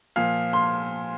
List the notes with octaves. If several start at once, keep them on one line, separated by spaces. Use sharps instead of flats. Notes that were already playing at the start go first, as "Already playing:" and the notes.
A#2 F3 F5
C6